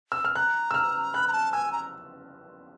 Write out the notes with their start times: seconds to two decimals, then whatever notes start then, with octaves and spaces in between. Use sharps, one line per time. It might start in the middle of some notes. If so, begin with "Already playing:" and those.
0.12 E6
0.25 F6
0.35 A#5 F#6
0.71 E6
0.74 F6
1.14 B5 F#6
1.28 A#5
1.33 A5
1.52 G#5 E6
1.72 A#5